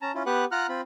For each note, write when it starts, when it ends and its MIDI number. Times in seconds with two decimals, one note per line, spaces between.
0.02 0.12 61
0.02 0.12 81
0.02 0.12 82
0.15 0.23 61
0.15 0.23 64
0.15 0.23 65
0.26 0.45 59
0.26 0.45 67
0.26 0.45 71
0.26 0.45 78
0.26 0.45 90
0.51 0.67 65
0.51 0.67 78
0.51 0.67 82
0.51 0.67 89
0.51 0.67 90
0.69 0.81 60
0.69 0.81 65
0.69 0.81 83